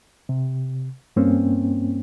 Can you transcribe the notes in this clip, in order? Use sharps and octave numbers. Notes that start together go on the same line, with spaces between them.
C3
G2 A#3 C4 C#4